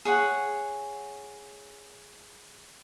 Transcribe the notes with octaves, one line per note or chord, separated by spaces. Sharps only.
G#4 C#5 F#5